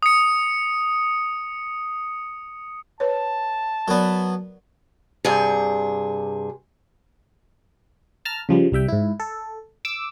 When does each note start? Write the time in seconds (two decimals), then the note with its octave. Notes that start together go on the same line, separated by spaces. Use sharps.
0.03 D#6 C#7
3.00 B4 C#5 A5
3.88 F#3 B3 A#4 D5
5.25 G2 C3 G#4
8.25 A5 A#5 F6
8.49 C#3 F3 G3
8.72 C2 G3 E5 G5
8.88 G#2 E4
9.20 A4
9.85 D6 E6